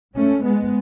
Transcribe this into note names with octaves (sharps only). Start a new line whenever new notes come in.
G#2 A3 C#4
G#3 B3